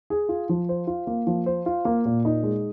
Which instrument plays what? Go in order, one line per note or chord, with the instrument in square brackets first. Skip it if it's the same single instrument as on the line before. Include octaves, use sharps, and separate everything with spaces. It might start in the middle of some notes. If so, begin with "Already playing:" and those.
[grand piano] G#4
F4
F3
C5
F4
A#3
F3
C5
F4
A#3
A#2
D#4
G#3